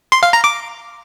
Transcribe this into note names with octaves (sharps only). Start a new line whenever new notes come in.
C6
F5
A#5
D6